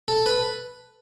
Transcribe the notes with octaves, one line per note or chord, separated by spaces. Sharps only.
A4
B4